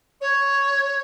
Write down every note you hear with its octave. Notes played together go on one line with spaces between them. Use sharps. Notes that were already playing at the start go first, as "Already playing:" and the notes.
C#5